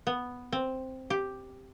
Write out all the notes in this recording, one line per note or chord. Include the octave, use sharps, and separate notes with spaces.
B3
C4
G4